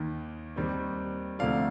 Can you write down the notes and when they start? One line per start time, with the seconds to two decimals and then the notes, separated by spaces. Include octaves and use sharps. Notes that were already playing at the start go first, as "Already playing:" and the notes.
Already playing: D#2 D#3 A#3
0.56 D#2 D#3 G3 C4
1.39 D2 C3 F3 A3 D5 F5